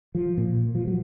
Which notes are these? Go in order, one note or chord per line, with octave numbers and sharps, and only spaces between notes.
F3
A#2
F3
F#3